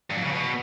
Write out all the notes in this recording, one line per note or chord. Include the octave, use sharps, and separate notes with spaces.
G2
F2
C#3
B2